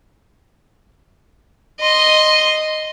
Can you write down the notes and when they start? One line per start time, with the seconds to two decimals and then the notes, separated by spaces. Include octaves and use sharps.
1.81 D#5 C6